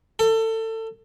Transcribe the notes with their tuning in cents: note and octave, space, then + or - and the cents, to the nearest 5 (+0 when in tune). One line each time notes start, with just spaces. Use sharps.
A4 +25